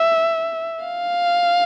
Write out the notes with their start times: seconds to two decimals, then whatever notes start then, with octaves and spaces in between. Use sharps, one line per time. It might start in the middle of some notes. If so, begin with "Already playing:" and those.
Already playing: E5
0.84 F5